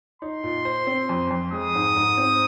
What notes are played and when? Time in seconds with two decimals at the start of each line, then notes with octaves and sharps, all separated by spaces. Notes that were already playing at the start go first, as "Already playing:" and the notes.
0.22 D#4 C6
0.44 A#2
0.65 C5
0.87 C4
1.09 F2
1.31 F2
1.52 G#3 D#6
1.75 G#2
1.96 G#2
2.18 C4